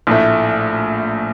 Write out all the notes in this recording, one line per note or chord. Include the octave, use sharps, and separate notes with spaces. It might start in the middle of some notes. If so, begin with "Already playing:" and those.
A#1 A2 A3